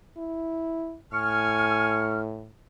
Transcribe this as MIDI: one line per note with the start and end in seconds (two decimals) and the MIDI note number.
0.17 0.96 64
1.13 2.52 45
1.13 2.09 80
1.13 2.20 85
1.13 2.20 89